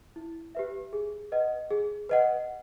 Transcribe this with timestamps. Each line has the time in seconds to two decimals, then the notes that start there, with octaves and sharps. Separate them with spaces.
0.16 E4
0.55 G4 B4 E5
0.93 G#4
1.32 B4 D#5 F#5
1.71 G#4
2.09 B4 D#5 F#5